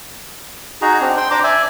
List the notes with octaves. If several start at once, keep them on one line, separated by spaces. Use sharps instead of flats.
D#4 F#4 G#4 A#5
C4 D4
G5 C6
D4 C5 A#5 D6
D5 E5 G#5